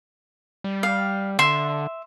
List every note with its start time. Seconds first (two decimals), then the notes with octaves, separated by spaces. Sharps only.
0.64 G3
0.83 F5
1.39 D3 E5 C6